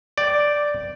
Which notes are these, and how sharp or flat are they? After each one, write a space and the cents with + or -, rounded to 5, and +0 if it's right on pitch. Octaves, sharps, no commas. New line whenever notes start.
D5 +0 G5 -10